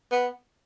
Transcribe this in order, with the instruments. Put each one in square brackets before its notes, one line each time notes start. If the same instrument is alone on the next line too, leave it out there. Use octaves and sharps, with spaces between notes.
[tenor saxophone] B3